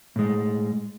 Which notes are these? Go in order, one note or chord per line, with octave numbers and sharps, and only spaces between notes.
A2 G#3